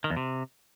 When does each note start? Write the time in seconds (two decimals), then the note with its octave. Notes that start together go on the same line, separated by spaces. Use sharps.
0.04 D#3
0.10 E2
0.16 C3